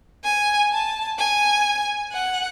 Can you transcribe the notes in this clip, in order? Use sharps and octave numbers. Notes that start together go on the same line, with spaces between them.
G#5
A5
G#5
F#5